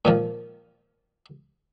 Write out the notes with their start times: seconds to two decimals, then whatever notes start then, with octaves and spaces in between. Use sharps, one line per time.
0.05 A#2 D#3 F3